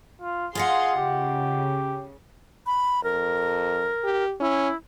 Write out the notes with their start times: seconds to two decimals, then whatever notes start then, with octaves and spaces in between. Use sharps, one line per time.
0.22 F4
0.55 F4 G#4 D#5 F5 F#5 C6
0.96 C#3 G4
2.66 B5
3.04 F2 A#4
4.04 G4
4.40 C#4 E4